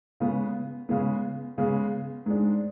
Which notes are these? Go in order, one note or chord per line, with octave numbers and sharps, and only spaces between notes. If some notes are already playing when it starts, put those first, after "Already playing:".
C#3 G#3 B3
C#3 G#3 B3
C#3 G#3 B3
G#2 G#3 D4